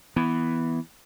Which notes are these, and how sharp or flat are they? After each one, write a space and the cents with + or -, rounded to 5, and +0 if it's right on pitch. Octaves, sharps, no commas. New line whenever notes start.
E3 +0 B3 +0